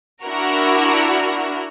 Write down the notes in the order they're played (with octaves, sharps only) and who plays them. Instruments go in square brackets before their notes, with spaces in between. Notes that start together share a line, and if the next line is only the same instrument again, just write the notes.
[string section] D4 E4 F#4 A#4